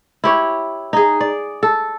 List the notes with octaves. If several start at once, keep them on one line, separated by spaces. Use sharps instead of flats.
E4 G4 C#5
D#4 G#4
D5
A4